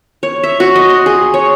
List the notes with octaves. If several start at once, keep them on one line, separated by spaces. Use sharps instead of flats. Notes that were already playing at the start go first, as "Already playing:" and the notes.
C#5
E5
F#4
D#5
C6
G#4
C#5